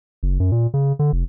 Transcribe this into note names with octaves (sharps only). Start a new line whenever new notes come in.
F#1
F#2
A#2
C#3
D3
F1